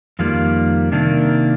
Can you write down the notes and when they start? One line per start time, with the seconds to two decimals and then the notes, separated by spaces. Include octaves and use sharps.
0.19 F2 D#3 G3 A#3 F4
0.92 C3 D#3 A#3 D4